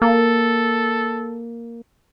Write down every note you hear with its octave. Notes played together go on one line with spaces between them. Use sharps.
A#3 A4